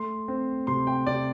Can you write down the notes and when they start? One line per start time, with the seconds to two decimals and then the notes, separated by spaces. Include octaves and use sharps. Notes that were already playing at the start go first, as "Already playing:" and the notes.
Already playing: A3 C6
0.28 C4
0.67 C3 C6
0.87 G5
1.06 C3 D5